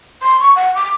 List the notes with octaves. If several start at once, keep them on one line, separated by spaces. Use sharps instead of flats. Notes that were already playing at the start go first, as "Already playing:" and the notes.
C6
C#6
F#5
D6